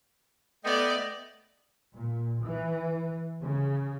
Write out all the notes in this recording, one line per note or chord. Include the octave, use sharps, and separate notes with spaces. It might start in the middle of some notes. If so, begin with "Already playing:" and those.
A3 B3 D5 D#5 G5
A#2
E3
C#3